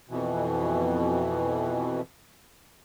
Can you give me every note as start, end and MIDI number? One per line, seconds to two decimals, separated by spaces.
0.10 2.01 41
0.10 2.01 47
0.10 2.01 52